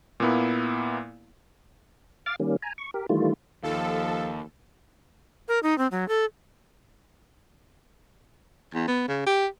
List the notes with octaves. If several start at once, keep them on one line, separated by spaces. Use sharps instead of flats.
A#2 A#3 B3 E4
F5 D6 F6 A6
D#3 G3 A#3 C#4
G#5 A#5
C#6
G4 A#4
D#3 E3 G3 A3 F4
D#2 F3 F4 A4
A#4
D#4
C4
F#3
A4
E2
B3
C#3
G4